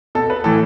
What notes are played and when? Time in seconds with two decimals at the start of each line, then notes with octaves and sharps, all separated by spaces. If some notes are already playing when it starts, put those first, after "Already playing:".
0.15 B2 A4
0.30 B4
0.44 A2 E3 A4